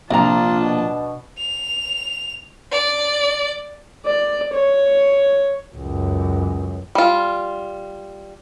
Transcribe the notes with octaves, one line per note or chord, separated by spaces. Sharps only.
A#1 C3 D4 F4 A5 A#5
B2
F7
D5
D5
C#5
C#2 F#2
G3 F4